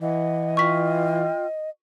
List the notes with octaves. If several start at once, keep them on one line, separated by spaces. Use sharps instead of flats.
E3 D#5 F#5
F4 G5 C#6 F6 B6